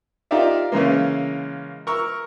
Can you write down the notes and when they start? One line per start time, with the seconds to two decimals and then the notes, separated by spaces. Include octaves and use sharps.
0.31 D#4 F4 G4 A#4 D5 E5
0.72 C#3 E3 G#3 A#3
1.87 A#4 C#6 E6